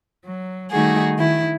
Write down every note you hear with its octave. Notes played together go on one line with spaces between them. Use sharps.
F#3
D#3 G3 A3 D#4 F#4 G#4
D#3 E4